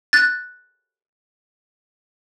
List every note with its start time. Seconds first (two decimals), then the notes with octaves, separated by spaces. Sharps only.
0.13 F#6 A6